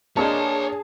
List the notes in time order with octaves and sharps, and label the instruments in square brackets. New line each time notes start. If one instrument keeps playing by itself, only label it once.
[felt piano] A#3 D4 D#5 [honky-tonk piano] G#4 A5 [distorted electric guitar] C#5 C6